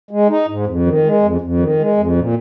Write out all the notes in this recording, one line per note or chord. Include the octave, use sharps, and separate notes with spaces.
G#3
D#4
G#2
F2
D#3
G#3
F2
F2
D#3
G#3
F2
A#2